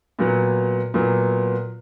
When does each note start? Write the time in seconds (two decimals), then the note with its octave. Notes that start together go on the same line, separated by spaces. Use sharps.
0.19 A#2 F#3 B3
0.94 A#2 F#3 B3